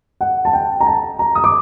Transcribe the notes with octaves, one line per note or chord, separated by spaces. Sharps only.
F#5
A5
G5
A#5
A5
A#5
D#6
D6